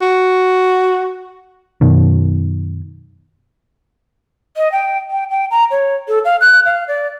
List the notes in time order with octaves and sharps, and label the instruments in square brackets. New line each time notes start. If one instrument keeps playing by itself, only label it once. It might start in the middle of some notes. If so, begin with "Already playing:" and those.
[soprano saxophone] F#4
[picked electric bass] F#2 B2 D#3
[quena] D#5
G5
G5
G5
A#5
C#5
A4
F5
F#6
F5
D5